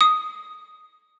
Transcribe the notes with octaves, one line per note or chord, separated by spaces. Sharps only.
D#6